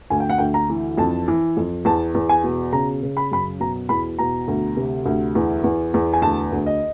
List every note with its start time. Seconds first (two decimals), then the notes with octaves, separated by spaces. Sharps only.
0.10 D2 G#5
0.20 G5
0.30 F#5
0.38 D2 G5
0.54 A#5
0.70 E3
0.98 F2 A5
1.28 E3
1.57 F2
1.85 E2 A5
2.15 E2
2.29 G#5
2.44 B2
2.72 C#3 A#5
3.03 C#3
3.17 B5
3.31 F#2 B5
3.60 B2 A#5
3.89 E2 B5
4.19 B2 A#5
4.48 D2
4.77 C3
5.06 D2
5.35 E2
5.64 E2
5.94 E2
6.13 G#5
6.22 D2 A5
6.52 D2
6.66 D#5